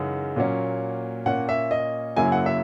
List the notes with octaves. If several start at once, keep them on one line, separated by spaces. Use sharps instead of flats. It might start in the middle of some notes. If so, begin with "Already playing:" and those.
Already playing: F#2 C#3 E3 G#3 D#4 F#5
A#2 F#3 A#3 C#4
A#2 A#3 C#4 F#5
E5
D#5
F#2 C#3 F#3 A#3 E4 G#5
F#5
E5